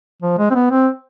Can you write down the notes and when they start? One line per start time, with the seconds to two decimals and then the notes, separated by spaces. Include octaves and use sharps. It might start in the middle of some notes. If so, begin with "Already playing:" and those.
0.22 F3
0.38 G#3
0.50 C4
0.55 B3
0.71 C4